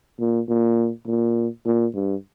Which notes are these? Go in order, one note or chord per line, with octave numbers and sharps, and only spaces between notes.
A#2
A#2
A#2
A#2
G2